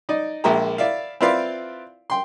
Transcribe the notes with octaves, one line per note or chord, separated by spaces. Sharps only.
D#4 D5 D#5
A#1 G#3 A#3 E5 G5 A#5
E4 D5 E5 F5
C4 E4 F4 B4 D5 F5
G5 C6